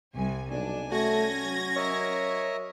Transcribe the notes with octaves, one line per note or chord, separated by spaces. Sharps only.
C2 G#5
B1 D4 G#5
A3 C#4 F#4 G#6 A#6
F#3
A#4 C#5 D#5 E5